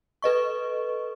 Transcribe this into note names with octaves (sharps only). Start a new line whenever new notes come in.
A4 B4 D#5 C#6